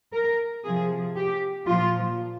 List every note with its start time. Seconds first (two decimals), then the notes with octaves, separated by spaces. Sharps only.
0.13 A#4
0.65 C3 F3 G#4
1.17 G4
1.66 A#2 F3 F4